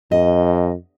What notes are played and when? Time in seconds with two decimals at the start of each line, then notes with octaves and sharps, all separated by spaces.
0.12 F2 D#5